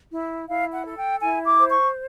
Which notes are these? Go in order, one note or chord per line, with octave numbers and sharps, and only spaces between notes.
E4
E4 F5
F#5
A4
G5
E4 G#5
D6
C5
C#6